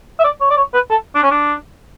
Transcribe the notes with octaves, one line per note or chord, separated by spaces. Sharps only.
E5
D5
C#5
D5
C#5
B4
A4
D4
C#4
D4